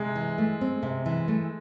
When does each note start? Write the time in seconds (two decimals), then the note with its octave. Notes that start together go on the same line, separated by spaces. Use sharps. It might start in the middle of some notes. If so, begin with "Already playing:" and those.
Already playing: C3 G#3
0.15 E3
0.38 A3
0.61 C4
0.83 C3
1.06 E3
1.28 A3